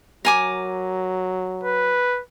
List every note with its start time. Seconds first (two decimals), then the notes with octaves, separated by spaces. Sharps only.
0.25 F#3 A#4 G#5 D6
1.64 B4